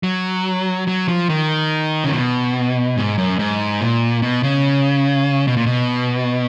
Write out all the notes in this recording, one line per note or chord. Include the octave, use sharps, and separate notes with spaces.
F#3
F#3
F3
D#3
C#3
B2
G#2
F#2
G#2
A#2
B2
C#3
B2
A#2
B2